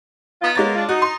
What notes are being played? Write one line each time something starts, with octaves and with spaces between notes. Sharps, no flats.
B3 D#4 F4
G#3 A#3 B3 C#5 A6
D4 F4
D#4 F#4
C6